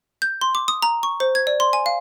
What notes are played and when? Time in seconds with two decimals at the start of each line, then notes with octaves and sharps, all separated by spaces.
0.22 G6
0.41 C6
0.55 D6
0.68 D#6
0.82 A#5
1.03 C#6
1.20 C5
1.35 G#6
1.47 D5
1.60 C6
1.73 G#5
1.86 F5